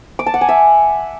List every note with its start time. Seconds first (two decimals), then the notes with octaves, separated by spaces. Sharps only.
0.19 D6
0.26 A5
0.34 F#5
0.41 G#5
0.49 E5